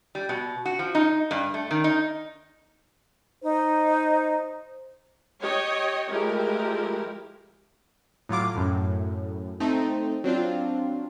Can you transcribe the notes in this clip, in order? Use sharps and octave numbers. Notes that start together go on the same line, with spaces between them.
G3
B2
F#4
F3
D#4
G2
A3
D#3
D#4
D#4 C5
G4 C#5 D#5 G5
F3 G#3 A3 E4 G4 A#4
A2 F#3 F4 D6
F#2 A2
A3 C4 D#4
F#3 C4 D4 F4